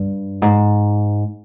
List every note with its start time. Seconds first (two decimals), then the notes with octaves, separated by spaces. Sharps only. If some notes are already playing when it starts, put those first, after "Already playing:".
Already playing: G2
0.42 G#2